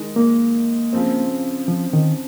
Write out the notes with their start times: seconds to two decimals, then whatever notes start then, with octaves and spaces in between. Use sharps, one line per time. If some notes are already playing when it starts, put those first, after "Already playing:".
Already playing: D#3 G#3 D#4 G#4
0.16 A#3
0.93 C#3 F3 C4
1.68 F3
1.93 D#3